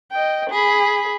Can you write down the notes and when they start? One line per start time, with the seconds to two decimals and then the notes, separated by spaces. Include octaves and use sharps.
0.12 D#5 G5
0.50 G#4 B5